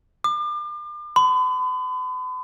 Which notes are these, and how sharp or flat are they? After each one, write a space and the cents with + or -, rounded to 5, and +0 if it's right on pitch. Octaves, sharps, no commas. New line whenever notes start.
D6 +35
B5 +45